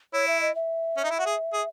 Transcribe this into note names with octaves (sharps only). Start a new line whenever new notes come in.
E4 C#5
E5
D#5
E5
C#4
D#4
E4
F#4
G#4
G#4